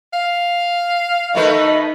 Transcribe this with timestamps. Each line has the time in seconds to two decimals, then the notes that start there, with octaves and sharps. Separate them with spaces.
0.13 F5
1.35 D#3 A3 D#4 B4